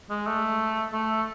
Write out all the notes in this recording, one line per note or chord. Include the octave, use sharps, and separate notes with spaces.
G#3
A3
A3